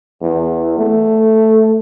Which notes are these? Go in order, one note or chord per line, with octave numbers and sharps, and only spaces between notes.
E2
A3